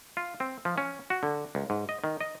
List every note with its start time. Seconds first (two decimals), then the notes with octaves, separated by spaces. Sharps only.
0.17 F4
0.40 C4
0.65 F3
0.78 C#4
1.10 F#4
1.23 D3
1.55 C#2
1.70 G#2
1.89 D#5
2.04 D#3
2.21 D#5